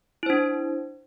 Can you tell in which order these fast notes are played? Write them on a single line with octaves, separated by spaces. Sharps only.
E4 C5 D4